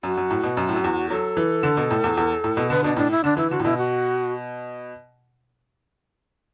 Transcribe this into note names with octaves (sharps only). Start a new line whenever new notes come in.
F#2 F#4
F#2
A2
B2
F#2
A2
F#2
E2
F#3 A4
E3
D3
B2
A2
E2
E2
A2
B2
D3 B4
B2 D4
A2 D4
E4
D3 D4
E3 E4
D3 F#4
A2
B2 E4
F#4